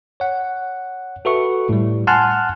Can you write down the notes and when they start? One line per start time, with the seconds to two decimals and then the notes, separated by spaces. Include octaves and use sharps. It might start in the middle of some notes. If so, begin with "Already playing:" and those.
0.20 C#5 F#5
1.25 F#4 A4 B4 E5 C#6
1.69 A2 G3
2.07 F#5 G#5 A5 C6 F6 F#6